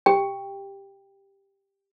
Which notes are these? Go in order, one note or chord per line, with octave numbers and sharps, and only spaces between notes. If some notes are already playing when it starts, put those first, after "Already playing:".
G4 G5